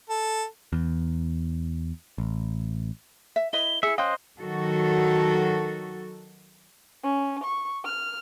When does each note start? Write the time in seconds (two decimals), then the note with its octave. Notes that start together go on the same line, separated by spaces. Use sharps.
0.09 A4
0.73 E2
2.18 A1
3.36 E5
3.53 E4 B4 D#5 G7
3.83 E4 G#4 E5 C#7
3.98 C#4 C5 D#5 F5 G5 F#6
4.39 D#3 F#3 F#4 A4
7.03 C#4
7.44 C#6
7.85 F6